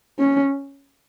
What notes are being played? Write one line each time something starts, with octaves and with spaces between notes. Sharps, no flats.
C#4